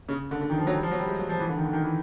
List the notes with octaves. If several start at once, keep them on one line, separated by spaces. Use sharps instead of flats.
C#3
D3
D3
D#3
F3
F#3
G3
F3
F#3
G3
G#3
F#3
F3
E3
D3
D#3
D3
D#3
E3